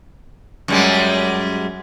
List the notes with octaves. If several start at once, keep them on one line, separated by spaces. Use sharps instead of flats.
F#2 G3 G#3